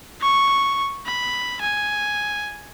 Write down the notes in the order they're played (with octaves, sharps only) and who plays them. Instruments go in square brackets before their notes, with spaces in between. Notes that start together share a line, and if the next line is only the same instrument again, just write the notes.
[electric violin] C#6
B5
G#5